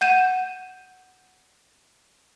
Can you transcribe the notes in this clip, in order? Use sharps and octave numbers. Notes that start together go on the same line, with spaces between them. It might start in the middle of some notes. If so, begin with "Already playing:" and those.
F#5 G6 D#7 E7